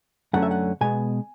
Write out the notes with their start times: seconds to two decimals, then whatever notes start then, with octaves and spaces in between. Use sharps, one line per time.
0.33 F#2 D3 F#3 A3 C#4 F#5
0.42 E5
0.51 F#5
0.81 B2 G#3 B3 G#5